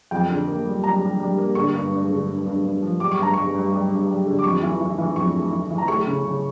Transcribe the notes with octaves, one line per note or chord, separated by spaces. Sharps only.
F2 G5
D3
A#3
G3
G3 A#5
G3
G3
A#3
D3 C#6
G2
G2
D3
G2
G2
G2
F3
G3 D6
C#6
G2 A#5
G2 C#6
G2
G3
G2
G3
D3
D6
F2 C#6
E3
E3
E3
F2 C#6
A3
E3
E3
A#5
A3 C#6
C#3
C#3